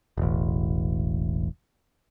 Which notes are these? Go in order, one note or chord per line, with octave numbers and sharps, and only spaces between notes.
E1 A1